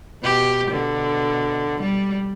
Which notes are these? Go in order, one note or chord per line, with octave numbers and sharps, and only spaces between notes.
B2 G4
B2 D3
G3